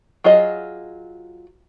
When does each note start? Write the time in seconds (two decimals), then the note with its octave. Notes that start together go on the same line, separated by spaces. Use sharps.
0.24 F#3 F4 G#4 D#5